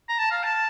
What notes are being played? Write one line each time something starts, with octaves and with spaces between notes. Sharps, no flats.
A#5
A5
F5
A5